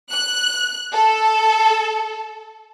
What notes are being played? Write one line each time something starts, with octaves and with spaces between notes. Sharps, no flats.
F#6
A4